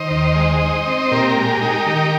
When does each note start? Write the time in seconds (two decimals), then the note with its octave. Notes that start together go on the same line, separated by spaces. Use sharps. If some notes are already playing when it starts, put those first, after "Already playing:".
Already playing: D#3 C5 D#5
0.11 D#2
0.36 G#3
0.61 D#4
0.86 C4
1.11 A#2 G4 A#4
1.37 G#3
1.61 D#4
1.87 D#3